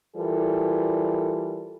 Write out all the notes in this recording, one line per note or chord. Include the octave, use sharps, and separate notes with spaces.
E3 G3 F4 A4 A#4